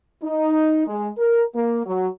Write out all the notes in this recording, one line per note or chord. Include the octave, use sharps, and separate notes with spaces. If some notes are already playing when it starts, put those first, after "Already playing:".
D#4
G#3
A#4
A#3
F#3